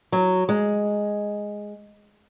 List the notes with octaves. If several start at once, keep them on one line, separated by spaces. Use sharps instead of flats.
F#3
G#3